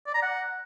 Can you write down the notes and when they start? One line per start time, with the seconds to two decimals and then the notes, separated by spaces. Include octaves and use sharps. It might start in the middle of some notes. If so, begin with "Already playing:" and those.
0.07 D5
0.14 A#5
0.22 F#5